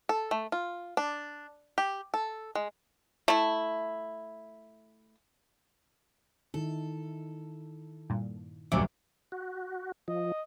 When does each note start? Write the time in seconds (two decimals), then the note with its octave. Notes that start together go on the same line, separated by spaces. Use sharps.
0.09 A4
0.31 A3
0.52 F4
0.97 D4
1.78 G4
2.14 A4
2.55 G#3
3.28 A3 E4
6.54 D#3 D#4 E4 A4
8.10 G2 A#2
8.72 F1 D2 G2 A#2 F#3 E5 D6
9.32 F#4
10.08 F3 D#5